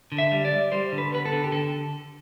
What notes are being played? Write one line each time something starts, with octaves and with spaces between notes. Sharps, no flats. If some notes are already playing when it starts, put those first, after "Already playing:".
D3
E5
G3
D5
G3
G3 C5
D3
B4
B3 B4
A4
D3
G4
D3 A4